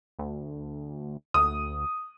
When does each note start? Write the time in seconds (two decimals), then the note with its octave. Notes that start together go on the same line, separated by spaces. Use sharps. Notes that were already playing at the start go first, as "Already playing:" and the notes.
0.19 D2
1.34 D2 D#6